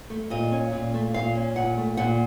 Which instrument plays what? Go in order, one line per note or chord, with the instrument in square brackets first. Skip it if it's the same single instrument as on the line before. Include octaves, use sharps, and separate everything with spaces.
[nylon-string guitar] A3
A#2 D#5
C#4
A#2
A3
A#2 F5
C#4
A#2 F#5
A3
A#2 F#5